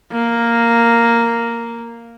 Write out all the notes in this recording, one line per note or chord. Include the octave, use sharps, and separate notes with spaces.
A#3